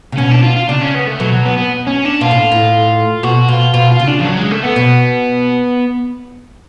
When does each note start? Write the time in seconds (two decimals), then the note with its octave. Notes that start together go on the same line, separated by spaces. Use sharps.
0.12 C#3
0.17 B2 C#4
0.31 D4
0.43 F4
0.56 F4
0.69 C#3 D4
0.81 C#4
0.95 B3
1.07 A3
1.20 B2 F#3
1.33 F#3
1.45 B3
1.57 B3
1.87 C#4
2.05 D4
2.21 B2 F4
2.31 A2
2.52 A2
3.23 B2 F#4
3.48 B2 F4
3.74 B2 F4
3.91 F4
4.00 C#3
4.07 D4
4.20 F3
4.24 F#3
4.37 G#3
4.51 A3
4.63 B3
4.76 B2